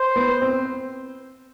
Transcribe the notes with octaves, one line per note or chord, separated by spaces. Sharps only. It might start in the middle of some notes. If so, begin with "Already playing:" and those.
Already playing: C5
B3
C4